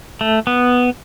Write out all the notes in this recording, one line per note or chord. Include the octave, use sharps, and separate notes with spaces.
A3
B3